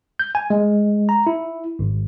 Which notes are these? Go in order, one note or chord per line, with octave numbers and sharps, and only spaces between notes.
G6
G#5
G#3
A#5
E4
G#1